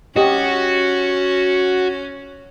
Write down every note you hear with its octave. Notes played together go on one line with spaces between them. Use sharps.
C#4 F#4 G4 D#5